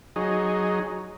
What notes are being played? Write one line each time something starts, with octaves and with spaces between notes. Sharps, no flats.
F#3 D#4 G#4